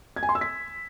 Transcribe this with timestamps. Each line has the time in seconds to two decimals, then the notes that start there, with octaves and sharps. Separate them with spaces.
0.16 G#6
0.23 G#5
0.29 C6
0.35 E6
0.41 B6